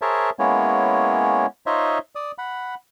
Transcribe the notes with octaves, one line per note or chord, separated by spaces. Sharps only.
G#4 A#4 C5 C#5 E5 A5
G#3 A#3 B3 C#4 E4 C#5
D#4 F4 C5 C#5 D#5 E5
D5 D#6
F#5 B5